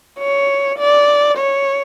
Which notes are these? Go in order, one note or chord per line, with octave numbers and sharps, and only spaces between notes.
C#5
D5
C#5